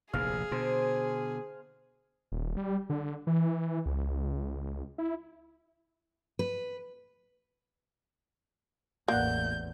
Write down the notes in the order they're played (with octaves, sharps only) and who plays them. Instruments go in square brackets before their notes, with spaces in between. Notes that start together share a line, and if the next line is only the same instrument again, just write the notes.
[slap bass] F1 A#1 D#2 [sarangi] G#4 [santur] F5
[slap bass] B2 D3 [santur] C5
[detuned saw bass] D#1
G3
D3
E3
C#2
E4
[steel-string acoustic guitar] B4
[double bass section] A1 E2 [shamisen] A#3 [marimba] D5 F#5 F#6 [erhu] G6